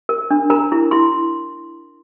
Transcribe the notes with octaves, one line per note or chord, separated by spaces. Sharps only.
A#4
D4
A#4 A#5
E4
E4 C6